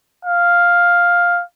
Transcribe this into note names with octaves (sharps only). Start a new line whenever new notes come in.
F5